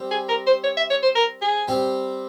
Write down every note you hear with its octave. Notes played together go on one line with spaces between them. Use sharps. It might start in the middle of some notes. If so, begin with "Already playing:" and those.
Already playing: G3 C4 G4
G#4
A#4
C5
C#5
E5
C#5
C5
A#4
G#4
G3 C4 G4